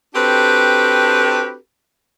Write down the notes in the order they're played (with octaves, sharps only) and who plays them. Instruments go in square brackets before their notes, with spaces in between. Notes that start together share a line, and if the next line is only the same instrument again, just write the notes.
[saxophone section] C4 D4 F#4 G4 A4 B4